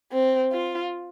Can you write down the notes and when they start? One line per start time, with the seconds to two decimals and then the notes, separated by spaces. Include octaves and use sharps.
0.12 C4
0.52 F4